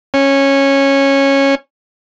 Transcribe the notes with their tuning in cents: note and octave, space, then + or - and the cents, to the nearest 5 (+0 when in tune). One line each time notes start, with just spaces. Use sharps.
C#4 -10